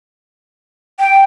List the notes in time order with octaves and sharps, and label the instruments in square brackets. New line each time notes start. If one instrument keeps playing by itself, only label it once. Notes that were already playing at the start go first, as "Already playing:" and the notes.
[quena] G5